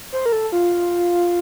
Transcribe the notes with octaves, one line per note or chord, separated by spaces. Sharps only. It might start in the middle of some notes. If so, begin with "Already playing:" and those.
C5
A#4
A4
F4